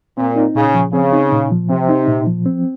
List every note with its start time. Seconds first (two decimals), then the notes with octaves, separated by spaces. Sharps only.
0.17 A#2 C4
0.36 D#4
0.55 A#2 C#3
0.74 F3
0.93 C#3 C4
1.13 D#4
1.32 A#2
1.51 F3
1.70 C3 C4
1.89 D#4
2.08 A#2
2.27 F3
2.46 C4